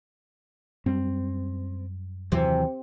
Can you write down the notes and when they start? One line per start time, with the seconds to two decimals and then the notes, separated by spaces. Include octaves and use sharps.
0.86 F#2 G3 C4
2.32 D#2 C3 E3 F#3